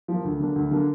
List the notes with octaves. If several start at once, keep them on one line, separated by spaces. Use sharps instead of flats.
F3
A#3
D2
D3 A#3 D4
D2
D3 A#3 D4